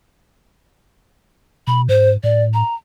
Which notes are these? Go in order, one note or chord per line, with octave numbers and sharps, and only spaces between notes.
B2 B5
G#2 C5
A2 D5
A#5